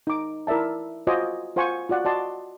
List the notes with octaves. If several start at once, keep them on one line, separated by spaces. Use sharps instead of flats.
D#4 D6
E4 A#4 D5 E5 A5
F4 F#4 C5 D#5 G#5 D6
F4 C5 F#5 G#5 C#6
F4 F#4 D5 F#5
F#4 D5 D#5 A5 C6